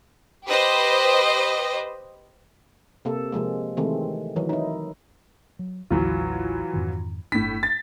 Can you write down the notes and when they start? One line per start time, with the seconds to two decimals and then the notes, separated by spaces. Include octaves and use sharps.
0.48 G4 B4 C5 D#5
3.05 C3 A#3 A4
3.32 C3 F3 G#3 A#3
3.77 C3 D#3 E3 G#3 A3 C4
4.36 D#3 E3 F#3
4.49 D#4 E4
5.59 F#3
5.90 A1 D#2 D3 E3 F#3 F4
6.73 F2 G#2 D#3
7.32 G1 A2 D4 B6
7.63 A6